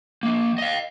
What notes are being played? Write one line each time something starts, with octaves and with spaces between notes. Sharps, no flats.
F3 A#3
D#5 F5